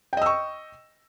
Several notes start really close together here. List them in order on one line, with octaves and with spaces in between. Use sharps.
G5 D#5 E6 C#6